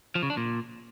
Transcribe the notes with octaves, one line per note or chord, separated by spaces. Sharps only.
F3
C#3
D4
A#2